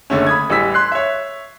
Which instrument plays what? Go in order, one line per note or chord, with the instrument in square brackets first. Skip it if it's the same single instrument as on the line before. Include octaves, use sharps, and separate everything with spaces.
[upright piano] F#1 D3 A3 C#4
B5 D#6 G#6
A1 E3 G3 E6 B6
C6 F#6 C7
C#5 E5